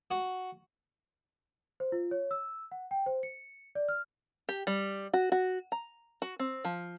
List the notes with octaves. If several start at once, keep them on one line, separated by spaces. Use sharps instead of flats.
F#4
C5
F4
C#5
E6
F#5
G5
C5
C#7
D5
F6
G4
G3
F#4
F#4
A#5
F#4
C4
F3